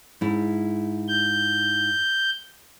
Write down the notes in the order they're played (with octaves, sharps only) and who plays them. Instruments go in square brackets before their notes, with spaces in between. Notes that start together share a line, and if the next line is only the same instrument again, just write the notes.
[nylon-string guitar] G#2 E4
[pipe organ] G6